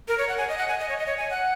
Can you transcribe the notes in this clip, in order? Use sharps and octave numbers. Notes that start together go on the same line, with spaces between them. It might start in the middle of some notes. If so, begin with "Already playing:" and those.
A#4
C#5
F#5
G#5
D#5
F#5
G#5
D#5
C#5
D#5
C#5
G#5
F#5